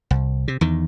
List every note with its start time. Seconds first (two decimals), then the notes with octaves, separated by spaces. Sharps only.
0.11 C2
0.48 C3
0.61 E2 D#3